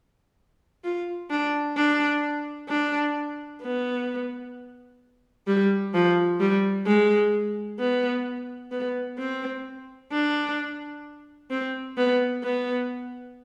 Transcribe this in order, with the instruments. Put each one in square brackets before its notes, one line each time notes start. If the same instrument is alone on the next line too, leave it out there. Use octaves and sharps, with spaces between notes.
[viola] F4
D4
D4
D4
B3
G3
F3
G3
G#3
B3
B3
C4
D4
C4
B3
B3